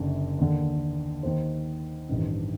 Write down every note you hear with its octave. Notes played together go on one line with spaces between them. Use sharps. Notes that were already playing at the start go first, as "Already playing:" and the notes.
Already playing: F#1 F#2 D3
D#2 D3
D#2 D#3 C5
A1 G2 D#3